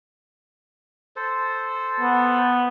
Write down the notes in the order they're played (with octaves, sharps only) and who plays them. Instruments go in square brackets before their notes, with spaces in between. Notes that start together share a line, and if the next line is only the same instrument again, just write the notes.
[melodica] A4 C5
[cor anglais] B3